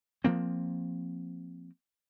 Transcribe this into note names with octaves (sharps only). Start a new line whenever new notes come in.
F3 A#3 C4